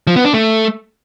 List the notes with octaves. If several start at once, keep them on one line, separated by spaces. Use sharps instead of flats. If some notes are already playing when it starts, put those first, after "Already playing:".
F3
B3
D4
A3